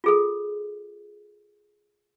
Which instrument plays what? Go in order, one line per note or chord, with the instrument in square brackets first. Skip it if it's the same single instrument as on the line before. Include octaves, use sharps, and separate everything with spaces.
[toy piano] F4 G#4 A4